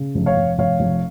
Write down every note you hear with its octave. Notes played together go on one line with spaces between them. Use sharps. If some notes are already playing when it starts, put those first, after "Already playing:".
Already playing: C#3
F1
C#5 F5
F1
F1 C#5 F5
F1